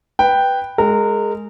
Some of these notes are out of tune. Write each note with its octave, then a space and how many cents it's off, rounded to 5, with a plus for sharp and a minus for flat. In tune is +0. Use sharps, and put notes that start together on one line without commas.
B4 +0 G5 +0
G#3 +0 A#4 -25